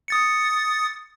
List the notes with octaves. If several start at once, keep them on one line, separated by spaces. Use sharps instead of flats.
D#6 A6 C#7